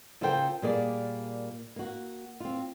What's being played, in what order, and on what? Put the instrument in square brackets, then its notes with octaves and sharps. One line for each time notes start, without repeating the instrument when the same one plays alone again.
[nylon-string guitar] C#3 F4 A4 A#4 C5 G5
A#2 G3 A#3 G#4 D5
A#3 F#4
C4 F4